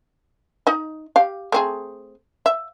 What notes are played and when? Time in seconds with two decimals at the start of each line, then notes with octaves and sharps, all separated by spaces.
0.67 D#4 D#5
1.16 G4 F5
1.52 A3 C4 G#4
2.46 E5